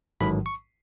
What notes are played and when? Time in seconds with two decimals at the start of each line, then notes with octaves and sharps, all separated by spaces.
0.21 A1 G#2 D#3 F#3 B5
0.46 C#6